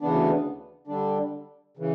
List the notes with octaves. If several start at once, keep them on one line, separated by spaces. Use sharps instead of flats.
D2 C#3 E3 B3 D4
D3 G3 D4
C#3 E3